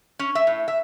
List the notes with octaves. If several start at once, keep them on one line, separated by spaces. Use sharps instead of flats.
C#4
E5
A2
E5